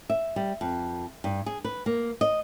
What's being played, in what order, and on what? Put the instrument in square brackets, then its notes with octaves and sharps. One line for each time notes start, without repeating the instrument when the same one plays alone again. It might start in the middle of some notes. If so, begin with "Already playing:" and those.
[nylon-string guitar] E5
G3
F2
G2
G#4
B4
A#3
D#5